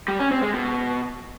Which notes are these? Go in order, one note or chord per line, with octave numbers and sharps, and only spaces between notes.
G3
C#4
C4
G#3
B2